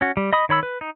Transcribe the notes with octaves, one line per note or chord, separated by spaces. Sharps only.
C#4 F#4
G3
D#5 B5 D#6
D#3 C#5 B5 E6
B4
D#4